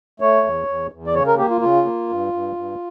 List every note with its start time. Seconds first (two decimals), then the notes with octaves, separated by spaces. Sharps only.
0.20 A3 C#5
0.44 E2
0.67 E2
0.92 E2
1.07 D5
1.15 C#3 C#5
1.27 A#4
1.38 A#3 G4
1.50 F4
1.61 C#3 F4
1.85 A#3
2.09 G2
2.33 G2
2.56 G2